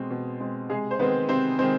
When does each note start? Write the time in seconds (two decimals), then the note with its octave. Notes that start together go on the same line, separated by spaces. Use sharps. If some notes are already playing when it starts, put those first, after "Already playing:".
Already playing: B2 G#3 C4
0.11 B2
0.40 G#3 C4
0.69 C3 G#3 G#4
0.91 C5
0.99 D#3 G#3 B3 C4 B4
1.29 C3 C4 C5
1.59 D#3 G#3 C4 C5